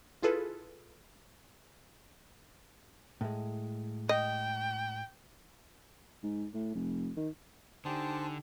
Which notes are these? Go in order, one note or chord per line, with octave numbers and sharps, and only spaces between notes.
E4 F4 G#4 A4 B4
A2 G#3
D#5 G5
G#2
A2
F1
D#3
D3 D4 D#4 G4 C5 G#5 A5